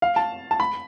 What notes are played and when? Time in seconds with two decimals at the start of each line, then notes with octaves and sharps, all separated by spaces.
0.02 F5
0.16 A5
0.51 A5
0.60 B5